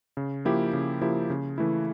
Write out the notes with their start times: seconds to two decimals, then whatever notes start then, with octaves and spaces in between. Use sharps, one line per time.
0.17 C#3
0.45 F3 A#3 E4 G4
0.73 C#3
1.01 F3 A#3 E4 G4
1.30 C#3
1.58 E3 A3 E4